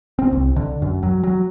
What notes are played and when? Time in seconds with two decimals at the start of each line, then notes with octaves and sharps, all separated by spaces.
0.19 C4
0.32 C2
0.56 D3
0.82 F#2
1.03 F#3
1.23 F#3